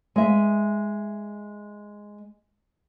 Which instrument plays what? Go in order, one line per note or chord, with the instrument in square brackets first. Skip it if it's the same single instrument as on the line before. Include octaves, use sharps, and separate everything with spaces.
[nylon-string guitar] G#3 E5